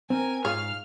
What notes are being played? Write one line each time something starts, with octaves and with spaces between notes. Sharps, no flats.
C4 A#4 G#5
G#2 F4 G#4 C#5 F5 F6